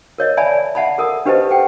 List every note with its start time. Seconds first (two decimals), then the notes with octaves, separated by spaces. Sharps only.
0.18 A#4 C#5 D#5
0.37 D5 E5 G#5 A5 B5
0.75 E5 F#5 A5 B5
0.98 A4 A#4 D#6
1.26 D4 G4 B4 C5 D#5 A5
1.50 A4 F#5 G5